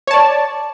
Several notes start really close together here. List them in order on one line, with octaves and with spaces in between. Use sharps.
C#5 A5 D5